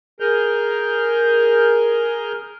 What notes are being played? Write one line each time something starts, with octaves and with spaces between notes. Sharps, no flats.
G#4 A#4 F6 G6